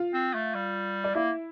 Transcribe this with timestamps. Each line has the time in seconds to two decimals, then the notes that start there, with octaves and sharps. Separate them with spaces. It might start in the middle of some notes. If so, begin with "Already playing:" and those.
Already playing: F4 F5
0.13 C4
0.34 A3
0.54 G3
1.04 D5
1.15 A#3 E4 E5